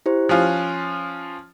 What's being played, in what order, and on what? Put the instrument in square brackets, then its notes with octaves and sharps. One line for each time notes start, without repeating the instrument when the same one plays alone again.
[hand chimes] E4 G4 C5
[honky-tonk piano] F3 C#4 F4 [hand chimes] F#6